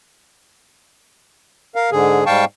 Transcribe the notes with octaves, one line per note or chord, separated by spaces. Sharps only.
A#4 F5
G#2 D3 G#4
G#2 G3 F5 G5 A5 C#6